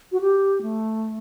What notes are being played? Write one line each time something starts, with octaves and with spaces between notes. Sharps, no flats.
F#4
G4
A3